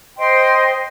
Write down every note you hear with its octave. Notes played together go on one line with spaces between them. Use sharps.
C5 D#5 G5 C6